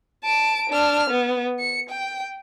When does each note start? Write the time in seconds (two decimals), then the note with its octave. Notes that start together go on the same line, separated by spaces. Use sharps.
0.24 A5 D7
0.70 D4 F6
1.10 B3
1.60 C#7
1.90 G5